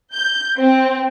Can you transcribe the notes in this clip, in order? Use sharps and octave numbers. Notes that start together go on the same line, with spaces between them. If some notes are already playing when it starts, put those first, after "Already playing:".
G6
C4